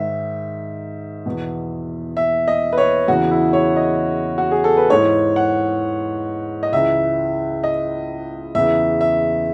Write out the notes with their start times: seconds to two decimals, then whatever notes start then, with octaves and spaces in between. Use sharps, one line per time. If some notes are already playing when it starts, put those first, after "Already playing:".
Already playing: G#2 D#3 E5
1.26 E2 B2
2.17 E5
2.48 D#5
2.73 B4
2.78 C#5
3.08 E2 C#3 E3 F#4
3.31 E4
3.53 C#5
3.77 D#5
4.38 F#4
4.51 G#4
4.64 A4
4.77 B4
4.90 G#2 E3 C#5
5.36 F#5
6.63 D#5
6.72 C#2 C#3 E3 E5
7.64 D#5
8.55 E2 C#3 E3 E5
9.01 E5